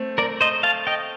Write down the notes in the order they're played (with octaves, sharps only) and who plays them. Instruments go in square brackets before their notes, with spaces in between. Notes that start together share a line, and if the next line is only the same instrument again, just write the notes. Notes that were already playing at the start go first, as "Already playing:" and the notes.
Already playing: [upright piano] A3 C4
[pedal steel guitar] A#4 D5
C5 D#5
F5 A5
D#5 G5